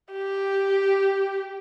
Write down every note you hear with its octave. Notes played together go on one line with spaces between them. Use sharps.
G4